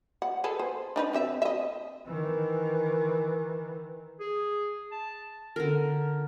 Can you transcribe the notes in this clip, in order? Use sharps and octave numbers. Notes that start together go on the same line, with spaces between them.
F#5
G#4 A4 B4
C5
D4 D#4 B4
D3 C4 E5
D#5 E5
D#3 E3
G#4
A5
D3 A#4